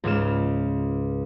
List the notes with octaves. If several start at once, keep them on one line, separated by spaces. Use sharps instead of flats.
C#2 G#2 C#3 F6 E7